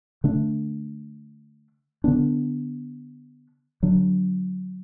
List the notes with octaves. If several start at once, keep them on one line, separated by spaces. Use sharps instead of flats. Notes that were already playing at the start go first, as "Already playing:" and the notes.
D3 A3 D4
D3 B3 D4
D3 F#3 D4